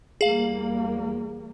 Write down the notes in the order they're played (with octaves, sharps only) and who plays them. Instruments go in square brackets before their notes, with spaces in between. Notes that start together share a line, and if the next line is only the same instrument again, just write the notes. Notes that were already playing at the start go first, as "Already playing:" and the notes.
[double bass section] E2 G3 A#3 [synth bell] G#4 F5